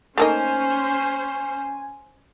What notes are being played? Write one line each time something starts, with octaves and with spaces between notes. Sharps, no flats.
A3 A#3 C#4 D#4 C5 G#5